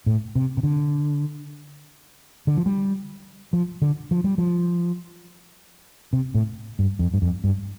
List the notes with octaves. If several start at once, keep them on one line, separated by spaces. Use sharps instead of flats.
A2
C3
C3
D3
D3
F3
G3
F3
D3
F3
G3
F3
C3
A2
G2
F2
G2
F2
G2